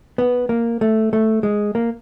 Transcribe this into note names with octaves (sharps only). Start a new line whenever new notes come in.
B3
A#3
A3
A3
G#3
A#3